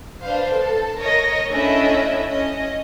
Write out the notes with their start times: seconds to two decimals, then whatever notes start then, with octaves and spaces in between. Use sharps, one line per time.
0.23 D4 B4 C5 F5
0.53 A4 A5
0.98 A#4 C#5 D#5 A#6
1.49 A3 C#4 D4 E4 D#5 E5
2.30 C#4 D#5